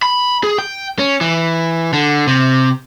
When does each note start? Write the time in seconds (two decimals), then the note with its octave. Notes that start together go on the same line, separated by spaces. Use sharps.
0.02 B5
0.44 G#4
0.58 G5
0.99 C#4
1.21 E3
1.93 D3
2.27 C3